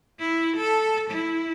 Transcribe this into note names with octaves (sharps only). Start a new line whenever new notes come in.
E4
A4
E4